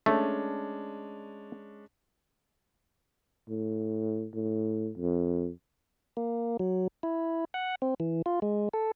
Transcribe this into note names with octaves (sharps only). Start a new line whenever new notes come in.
G#3 A3 C#4 D4
A2
A2
F2
A#3
F#3
E4
F#5
C4
E3
F4
G#3
A4